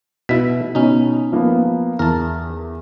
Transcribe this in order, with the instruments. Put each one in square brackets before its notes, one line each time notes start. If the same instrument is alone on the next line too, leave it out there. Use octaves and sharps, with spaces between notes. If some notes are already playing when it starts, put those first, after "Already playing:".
[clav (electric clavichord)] B2 E4 [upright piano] B6
[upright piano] B2 [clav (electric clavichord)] C#4 D#4
[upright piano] F3 A#3 B3
[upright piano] E2 [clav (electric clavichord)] A#4 A5